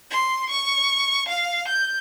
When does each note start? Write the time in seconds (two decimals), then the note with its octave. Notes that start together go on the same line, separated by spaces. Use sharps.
0.11 C6
0.50 C#6
1.29 F5
1.68 G6